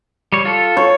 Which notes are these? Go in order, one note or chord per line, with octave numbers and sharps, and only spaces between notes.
G3 C#5
F4 A4
C#5